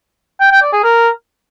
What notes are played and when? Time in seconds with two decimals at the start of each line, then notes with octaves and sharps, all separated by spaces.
0.40 G5
0.51 G5
0.62 D5
0.73 G#4
0.83 A#4